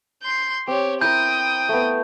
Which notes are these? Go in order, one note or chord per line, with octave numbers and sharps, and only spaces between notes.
C6 G6
C4 G4 C#5
E4 A#4 G5 D#6 G6
A3 B3